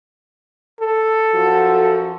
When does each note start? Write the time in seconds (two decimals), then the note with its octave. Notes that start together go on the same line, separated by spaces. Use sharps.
0.80 A4
1.33 F#2 F3 F#4